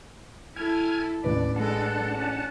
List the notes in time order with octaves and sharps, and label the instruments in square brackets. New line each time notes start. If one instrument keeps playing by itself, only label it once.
[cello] E4 A4 [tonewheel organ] G#5 F6 G#6
[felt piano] A1 B4 [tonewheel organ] D#2 D4 [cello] D5
[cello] G#3 A4 [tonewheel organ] D4 F#5 A5
[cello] C#4